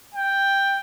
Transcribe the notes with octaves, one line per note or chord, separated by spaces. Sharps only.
G5